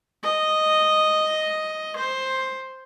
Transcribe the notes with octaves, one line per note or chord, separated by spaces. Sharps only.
D#5
C5